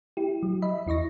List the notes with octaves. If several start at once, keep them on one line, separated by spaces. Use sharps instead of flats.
E4 G4
F#3
D#5 E5 B5
E2 E4 D#5 C#6 A#6